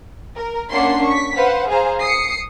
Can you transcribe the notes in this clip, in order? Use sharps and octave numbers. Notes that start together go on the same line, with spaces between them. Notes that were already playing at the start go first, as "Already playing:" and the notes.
A#4
A#3 C#4 D4 F#5 C6 C7
C#6 B6
B4 C5 F5 F#5
G#4 C5 F5 A#5
D#6 C7 C#7